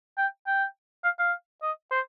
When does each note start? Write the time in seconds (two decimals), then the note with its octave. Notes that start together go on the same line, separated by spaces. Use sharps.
0.18 G5
0.47 G5
1.04 F5
1.19 F5
1.62 D#5
1.91 C5